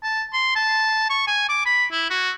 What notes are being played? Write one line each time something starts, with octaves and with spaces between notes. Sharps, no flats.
A5
C6
A5
C#6
G#5
D6
B5
E4
F#4